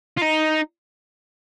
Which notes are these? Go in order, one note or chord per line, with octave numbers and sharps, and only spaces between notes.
F4
D#4